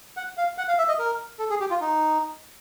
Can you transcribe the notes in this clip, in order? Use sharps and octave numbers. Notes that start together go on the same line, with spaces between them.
F#5
F5
F#5
F5
E5
D#5
A#4
A4
G#4
G4
F4
D#4